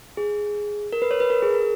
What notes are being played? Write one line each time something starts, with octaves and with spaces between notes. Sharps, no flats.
G#4
A#4
B4
C#5
B4
A#4
G#4
A#4